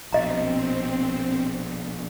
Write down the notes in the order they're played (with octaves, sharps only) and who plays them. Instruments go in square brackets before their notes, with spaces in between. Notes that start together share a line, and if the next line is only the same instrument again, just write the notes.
[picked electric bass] A#1 B2 [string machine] C4 [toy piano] D#5 A#5